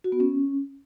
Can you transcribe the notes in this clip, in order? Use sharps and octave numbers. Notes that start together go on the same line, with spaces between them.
F#4
B3
C#4